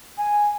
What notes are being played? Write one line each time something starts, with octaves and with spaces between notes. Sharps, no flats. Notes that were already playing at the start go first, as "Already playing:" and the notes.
G#5